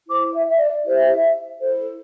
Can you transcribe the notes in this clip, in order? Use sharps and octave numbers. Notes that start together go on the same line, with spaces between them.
E4 C5 D6
E5
E5
D5
E4 G4 C5 E5
E4 A4 C5